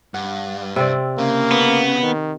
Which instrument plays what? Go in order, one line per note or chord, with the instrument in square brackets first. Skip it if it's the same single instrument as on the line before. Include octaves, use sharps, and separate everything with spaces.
[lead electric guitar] G2 [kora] F#5
[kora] C3 C4 D5
[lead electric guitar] C#3 [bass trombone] A#3
[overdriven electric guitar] B3
[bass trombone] D#3